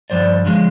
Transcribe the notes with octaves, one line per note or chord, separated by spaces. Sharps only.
G2 D3 F3 C5 D5
D3 F3 G#3